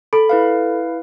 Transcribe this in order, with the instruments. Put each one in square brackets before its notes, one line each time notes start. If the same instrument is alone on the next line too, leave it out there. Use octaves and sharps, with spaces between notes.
[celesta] A4 [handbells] B5
[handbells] E4 B4 F5